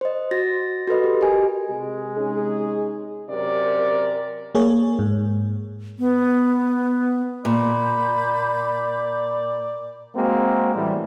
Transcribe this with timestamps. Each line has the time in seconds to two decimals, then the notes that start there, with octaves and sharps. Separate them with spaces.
0.01 C5 D#5
0.31 F#4 A6 A#6
0.87 F#4 A4 B4 D#5
1.04 G4
1.21 G4 A#4 D#5 G#5
1.70 C3 G#3
2.17 C#4 D#4 G#4
3.29 F#2 C3 G4 A#4 D5
4.55 A#3 G#4 C#5
4.99 G#2
5.99 B3
7.45 A#2 D5 B5 G6
10.16 G#3 A#3 C4 F#4
10.75 A2 E3 G3